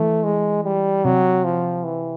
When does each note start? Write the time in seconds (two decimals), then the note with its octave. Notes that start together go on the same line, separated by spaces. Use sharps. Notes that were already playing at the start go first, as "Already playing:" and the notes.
Already playing: E3 A3
0.25 G#3
0.64 G3
1.05 C3 F#3
1.44 F3
1.84 E3